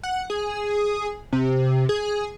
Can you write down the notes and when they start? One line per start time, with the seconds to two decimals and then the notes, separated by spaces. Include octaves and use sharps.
0.03 F#5
0.30 G#4
1.32 C3
1.89 G#4